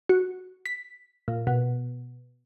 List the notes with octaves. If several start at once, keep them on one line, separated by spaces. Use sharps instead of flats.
F#4
B6
A#2
B2